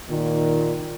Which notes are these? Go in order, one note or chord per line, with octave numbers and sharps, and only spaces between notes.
A#2 D#3